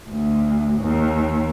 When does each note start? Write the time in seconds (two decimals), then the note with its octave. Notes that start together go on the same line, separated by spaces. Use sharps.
0.11 D2
0.81 D#2